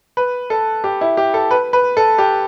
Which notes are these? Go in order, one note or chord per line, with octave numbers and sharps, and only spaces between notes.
B4
A4
G4
E4
G4
A4
B4
B4
A4
G4